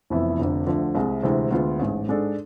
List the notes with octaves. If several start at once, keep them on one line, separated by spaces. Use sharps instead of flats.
F1 F2 E3 B3 E4
F1 F2 D3
D2 D3 F3 A3
C2 C3 G#3
D2 C3 E3 G#3 C4
D2 D3 G#3 B3 F4
A1 G#2 G#3
G#2 G#3 D4 A4